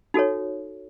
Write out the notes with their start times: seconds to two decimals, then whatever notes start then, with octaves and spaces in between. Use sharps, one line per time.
0.14 D#4 F#4 A4 C#5